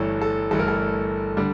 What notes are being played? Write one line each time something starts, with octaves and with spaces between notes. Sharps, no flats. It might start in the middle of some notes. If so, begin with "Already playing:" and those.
Already playing: G1 G2 E3 A3 A4 C#5
A4
G1 G2 E3 A3 A4
A#4
A4
D3 G3 D4